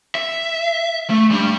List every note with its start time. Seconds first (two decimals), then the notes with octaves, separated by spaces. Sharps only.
0.15 E5
1.10 A3
1.31 G3 D4